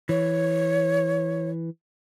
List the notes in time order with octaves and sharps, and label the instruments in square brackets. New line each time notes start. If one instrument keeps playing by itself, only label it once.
[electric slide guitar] E3 [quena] C#5